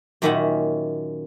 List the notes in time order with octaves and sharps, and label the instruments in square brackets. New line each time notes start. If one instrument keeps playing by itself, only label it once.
[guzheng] F#2 A#2 D#3 C#4 E5 F#5